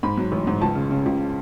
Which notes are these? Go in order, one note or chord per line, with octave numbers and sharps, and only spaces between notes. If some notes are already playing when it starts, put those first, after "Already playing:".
G#2 B5
F#3
A1
G#2
C#2 A5
C#3
C#3
C#2